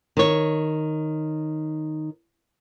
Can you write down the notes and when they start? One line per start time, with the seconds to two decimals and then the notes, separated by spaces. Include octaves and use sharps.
0.17 D#3 C#5